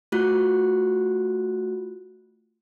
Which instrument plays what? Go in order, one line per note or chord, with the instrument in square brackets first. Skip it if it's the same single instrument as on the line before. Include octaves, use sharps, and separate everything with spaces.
[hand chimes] A3 F4 F#4 F#6